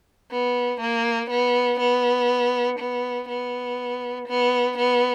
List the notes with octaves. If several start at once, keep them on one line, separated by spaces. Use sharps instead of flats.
B3
A#3
B3
B3
B3
B3
B3
B3